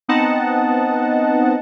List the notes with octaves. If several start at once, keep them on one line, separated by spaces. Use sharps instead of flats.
B3 C4 D#4 D#5 F#5 A5